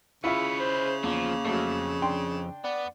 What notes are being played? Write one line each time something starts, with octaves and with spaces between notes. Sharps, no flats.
C#3 G#3 E4 F4 B4 E5 C#6
C5
E2 F3 A#3
F2 F#3 A3
D4 G5 C6
B3 D5